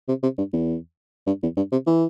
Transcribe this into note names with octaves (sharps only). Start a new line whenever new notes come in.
C3
C3
G2
E2
G2
E2
G2
C3
E3